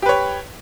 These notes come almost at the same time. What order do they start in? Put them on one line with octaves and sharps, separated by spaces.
G4 B4 C#5